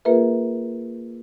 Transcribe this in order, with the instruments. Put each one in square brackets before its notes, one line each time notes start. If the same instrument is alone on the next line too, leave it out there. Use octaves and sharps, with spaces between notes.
[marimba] A#3 F4 G#4 A#4 B4 E5